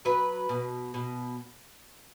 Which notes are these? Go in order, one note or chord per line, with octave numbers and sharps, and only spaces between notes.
F#3 B4
B2
B2